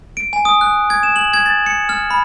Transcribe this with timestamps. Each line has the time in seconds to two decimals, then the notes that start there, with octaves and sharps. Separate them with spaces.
0.17 D7
0.33 G#5
0.45 D#6
0.61 F#6
0.90 G#6
1.03 E7
1.16 F#7
1.34 G#6
1.46 A6
1.66 C#7
1.89 F6
2.10 B5